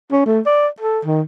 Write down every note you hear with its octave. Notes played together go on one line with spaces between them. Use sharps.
C#4
A3
D5
A4
D#3